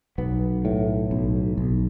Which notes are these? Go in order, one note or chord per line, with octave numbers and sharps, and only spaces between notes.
B1 B3
A2
B1
B1